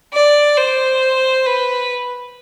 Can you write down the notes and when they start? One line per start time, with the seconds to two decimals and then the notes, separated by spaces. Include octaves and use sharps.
0.13 D5
0.57 C5
1.46 B4